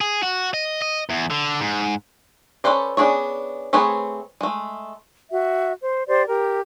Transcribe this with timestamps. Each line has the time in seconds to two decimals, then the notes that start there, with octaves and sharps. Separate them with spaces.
0.01 G#4
0.23 F#4
0.54 D#5
0.82 D#5
1.10 E2
1.31 D3
1.61 G#2
2.64 C#4 A4 B4 C5 D5
2.97 B3 C#4 D4 G#4 C#5
3.73 A3 C4 G#4 B4 C#5
4.41 G#3 A3
5.29 F#4 E5
5.80 C5
6.07 G4 C5 D5
6.27 G4 A#4